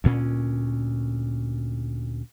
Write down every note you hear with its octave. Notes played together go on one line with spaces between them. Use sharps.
D2 A#2 C#4